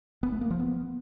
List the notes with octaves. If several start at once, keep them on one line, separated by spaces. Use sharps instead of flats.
B3
A3
A#3
F3
B3